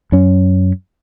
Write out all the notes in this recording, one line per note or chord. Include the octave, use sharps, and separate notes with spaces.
F#2 C#4